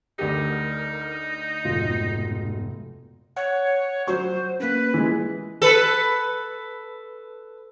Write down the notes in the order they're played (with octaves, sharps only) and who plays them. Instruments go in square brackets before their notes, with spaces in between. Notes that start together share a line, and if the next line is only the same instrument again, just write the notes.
[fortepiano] D2 G4 [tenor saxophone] D#4 [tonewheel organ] A#4
[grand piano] F1 F4 [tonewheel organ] G#2 B2
[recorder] C#5 [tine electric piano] F#5 F#6
[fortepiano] F#3 C#6 [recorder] C5
[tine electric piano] A#3 C#4 [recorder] B4
[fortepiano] E3 G#3
[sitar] A4 B4